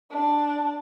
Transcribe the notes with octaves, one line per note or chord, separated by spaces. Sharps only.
D4 A5